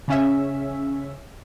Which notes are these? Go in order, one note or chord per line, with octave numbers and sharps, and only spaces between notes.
C#3 C#4 E5